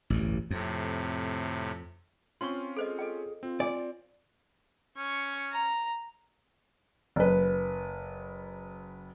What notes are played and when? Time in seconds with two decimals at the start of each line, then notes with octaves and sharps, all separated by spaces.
0.10 A1 D2 G2
0.50 F2 A2 C3
2.41 C4 C#4 F4 C6 C#6
2.77 G#4 A4 C5 D#5
2.99 A4 D#5 G5
3.43 C4 F4
3.60 D5 G#5
4.97 C#4 C#6
5.52 A#5
7.16 F#1 B4